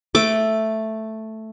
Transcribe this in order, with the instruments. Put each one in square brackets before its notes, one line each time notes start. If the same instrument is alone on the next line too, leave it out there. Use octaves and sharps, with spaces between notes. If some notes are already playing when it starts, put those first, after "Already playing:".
[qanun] A3 D6